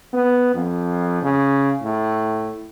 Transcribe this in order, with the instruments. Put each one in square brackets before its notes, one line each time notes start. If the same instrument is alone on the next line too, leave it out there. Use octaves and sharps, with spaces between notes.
[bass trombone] B3
F2
C#3
A2